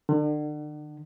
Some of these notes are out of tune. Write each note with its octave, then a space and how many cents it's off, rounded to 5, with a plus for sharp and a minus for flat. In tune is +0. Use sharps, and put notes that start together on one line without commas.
D3 +35